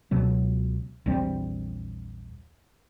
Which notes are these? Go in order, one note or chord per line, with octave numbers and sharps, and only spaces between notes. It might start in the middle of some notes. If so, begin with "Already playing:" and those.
C#2 B2 F#3 B3
A#1 E2 G3 C4